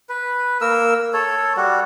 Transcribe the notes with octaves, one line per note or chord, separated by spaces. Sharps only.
B4
A#3 A#4 E6
A4 C#5
G3 F#4